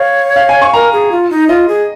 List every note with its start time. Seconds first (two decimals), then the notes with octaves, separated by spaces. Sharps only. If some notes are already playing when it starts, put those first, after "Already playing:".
Already playing: C#5 F5
0.36 F5
0.49 G#5
0.62 C#6
0.74 A#4 A#5
0.92 G#4
1.12 F4
1.30 D#4
1.49 F4 D#5
1.68 G#4